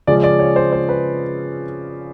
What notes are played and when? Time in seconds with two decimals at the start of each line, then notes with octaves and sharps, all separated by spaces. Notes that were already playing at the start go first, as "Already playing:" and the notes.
0.07 C#3 F3 G#3 C#4 D5
0.24 D5
0.39 C#5
0.56 C5
0.72 C5
0.89 B4